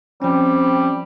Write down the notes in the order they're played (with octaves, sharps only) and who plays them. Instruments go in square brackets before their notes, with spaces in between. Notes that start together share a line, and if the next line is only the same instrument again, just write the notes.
[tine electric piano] F3 C#4 [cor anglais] G3 [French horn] C4